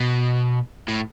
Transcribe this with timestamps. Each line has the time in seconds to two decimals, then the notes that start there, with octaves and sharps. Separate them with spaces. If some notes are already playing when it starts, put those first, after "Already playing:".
Already playing: B2
0.88 A2